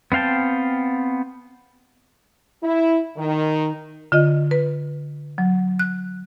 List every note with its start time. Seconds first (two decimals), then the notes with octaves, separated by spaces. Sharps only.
0.12 B3 C4 F5 G5 A5
2.62 E4
3.17 D#3
4.12 D3 F4 D#5
4.51 B4
5.38 F#3
5.79 F#6